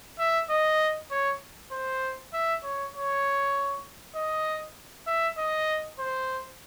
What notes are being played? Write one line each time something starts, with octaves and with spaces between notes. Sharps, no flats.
E5
D#5
C#5
C5
E5
C#5
C#5
D#5
E5
D#5
C5